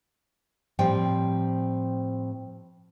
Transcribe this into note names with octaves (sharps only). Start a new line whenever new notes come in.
A2 F3 G3 C4 G5